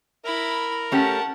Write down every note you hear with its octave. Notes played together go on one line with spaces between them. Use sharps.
E4 A#4 A#5 B5
A3 C#4 G4 F#5 A5